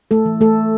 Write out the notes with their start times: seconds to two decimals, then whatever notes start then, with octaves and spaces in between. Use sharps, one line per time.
0.11 A3 A4
0.25 E3
0.41 A3 A4